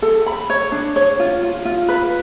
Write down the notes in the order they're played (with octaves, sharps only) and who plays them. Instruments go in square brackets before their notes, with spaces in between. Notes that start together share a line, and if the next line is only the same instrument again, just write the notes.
[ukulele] A4
B5
C#5
D4
C#5
F4
F4
F4
B4